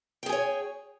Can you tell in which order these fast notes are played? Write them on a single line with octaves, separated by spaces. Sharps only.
G5 G#4 G#5 C#5